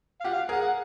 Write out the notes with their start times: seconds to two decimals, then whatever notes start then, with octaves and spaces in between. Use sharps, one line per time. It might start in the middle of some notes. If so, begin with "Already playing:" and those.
0.20 F5
0.24 F4 G4 F#5
0.33 F5
0.49 G#4 A#4 F#5
0.61 F#5